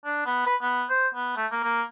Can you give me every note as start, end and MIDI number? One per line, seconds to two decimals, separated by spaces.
0.05 0.24 62
0.26 0.43 59
0.47 0.56 71
0.62 0.85 59
0.90 1.08 72
1.15 1.34 59
1.37 1.47 57
1.52 1.60 58
1.64 1.83 58